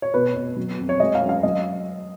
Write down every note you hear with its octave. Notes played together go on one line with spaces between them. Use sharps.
C#5
B2 B4
B2
F#3
F2
C#5
G#3 D#5
F5
F#2
F5
F#3 D#5